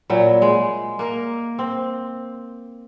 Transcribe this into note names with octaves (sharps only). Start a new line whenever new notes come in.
A#2 F#3 E4
G#3
A#3 A#4
C4